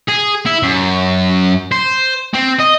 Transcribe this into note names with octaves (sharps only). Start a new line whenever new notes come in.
G#4
E4
F#2
C5
C4
D#5